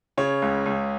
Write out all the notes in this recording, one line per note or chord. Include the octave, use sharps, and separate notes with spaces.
C#3 C#5
C#2
C#2